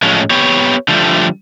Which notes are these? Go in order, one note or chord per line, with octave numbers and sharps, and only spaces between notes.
A2 F3 G#3 A3 C#4
B3 G4 C#5
D3 F3 G3 A3